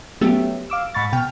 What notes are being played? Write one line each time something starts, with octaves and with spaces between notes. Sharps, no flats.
F#3 A3 B3 C#4 G4 E5
F5 D6 E6
G#2 B5 C#6 A6
B2 G5 F6